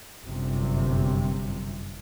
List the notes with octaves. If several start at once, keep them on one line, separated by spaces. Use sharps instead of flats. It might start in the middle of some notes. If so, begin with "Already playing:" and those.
G1 F#2 C3